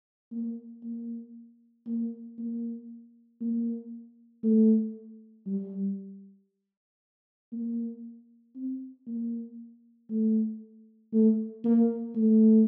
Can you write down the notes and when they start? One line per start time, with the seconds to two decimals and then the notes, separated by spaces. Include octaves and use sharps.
0.31 A#3
0.83 A#3
1.86 A#3
2.38 A#3
3.41 A#3
4.43 A3
5.46 G3
7.52 A#3
8.55 C4
9.07 A#3
10.10 A3
11.13 A3
11.64 A#3
12.15 A3